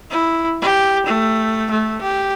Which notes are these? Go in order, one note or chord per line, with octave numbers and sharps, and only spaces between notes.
E4
G4
A3
A3
G4